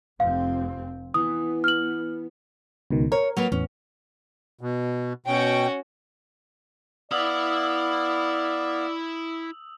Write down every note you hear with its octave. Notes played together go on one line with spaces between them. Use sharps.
F1 F2 C4 F5
E3 B3 D#6
F6 F#7
C#2 B2 D#3
A#4 C#5
F#3 A#3 B3
E2 A2 C#4
B2
B2 C#4 F#4 G5
B3 E4 D5 F5 B5 D#6 E6 F#7